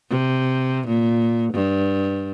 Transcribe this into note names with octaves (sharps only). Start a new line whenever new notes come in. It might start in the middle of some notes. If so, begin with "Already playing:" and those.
C3
A#2
G2